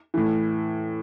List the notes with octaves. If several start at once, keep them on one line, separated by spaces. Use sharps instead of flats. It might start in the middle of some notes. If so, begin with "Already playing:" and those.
A2 E3